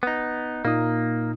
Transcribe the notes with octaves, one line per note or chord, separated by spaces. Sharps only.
B3 D#4
A#2 A#3 D#4 D#6